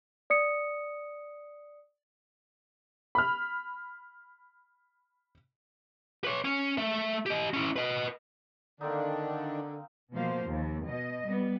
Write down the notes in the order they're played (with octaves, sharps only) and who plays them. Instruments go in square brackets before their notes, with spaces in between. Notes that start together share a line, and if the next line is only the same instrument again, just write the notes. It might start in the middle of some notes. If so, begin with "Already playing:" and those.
[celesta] D5 D#6 C#7
[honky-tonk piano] B5 F6
[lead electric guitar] B4 C#5
C#4
A3 E5
G4 D#5
C#4 E4
B4 D#5
[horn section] D3 [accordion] D#3 D4 [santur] A#3 C4 D#4
[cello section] B2 F3 A#3 C5 F5
D#2
B2 D#5
G3 B3